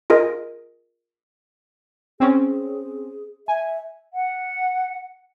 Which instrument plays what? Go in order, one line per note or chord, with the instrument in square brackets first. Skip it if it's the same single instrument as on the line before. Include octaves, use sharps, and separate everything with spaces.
[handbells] F4 G#4 A#4 D#5
[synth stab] C4 C#4 [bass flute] G#4
[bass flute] E5 [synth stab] G#5
[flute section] F#5